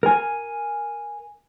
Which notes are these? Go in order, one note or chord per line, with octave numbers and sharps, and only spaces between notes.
A#4 G#5